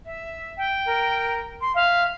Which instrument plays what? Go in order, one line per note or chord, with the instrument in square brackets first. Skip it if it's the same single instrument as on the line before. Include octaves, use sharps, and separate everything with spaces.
[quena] E5
[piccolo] G5
[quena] A#4
C6
[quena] E5 [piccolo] F5